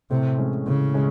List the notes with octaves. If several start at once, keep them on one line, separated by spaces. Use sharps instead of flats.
A2 C3
E3 G#3 C#4
A2 C#3
E3 G#3 C#4